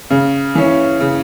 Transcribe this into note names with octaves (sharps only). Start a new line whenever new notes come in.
C#3
E3 C#4
C#3